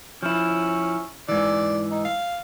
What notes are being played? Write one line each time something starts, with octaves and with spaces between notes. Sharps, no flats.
F3 C#4 E4
G#2 E3 D5
D#4
F5